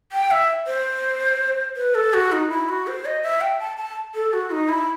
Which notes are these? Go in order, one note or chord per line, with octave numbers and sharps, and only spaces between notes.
G5
E5
C5
B4
A4
F#4
D#4
E4
F#4
C5
D#5
E5
G5
A5
A5
A4
F#4
D#4
E4